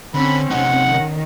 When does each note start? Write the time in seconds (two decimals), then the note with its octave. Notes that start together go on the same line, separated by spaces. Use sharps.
0.15 D3 C4 C#4 B5
0.51 C3 D#4 F#5
0.90 D#3